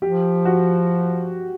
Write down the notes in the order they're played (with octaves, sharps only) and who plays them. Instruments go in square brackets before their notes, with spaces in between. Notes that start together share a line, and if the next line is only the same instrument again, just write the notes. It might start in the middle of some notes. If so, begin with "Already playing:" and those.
[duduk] F3 [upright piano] G4
[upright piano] F#4